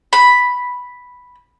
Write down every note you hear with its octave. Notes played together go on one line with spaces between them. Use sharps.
B5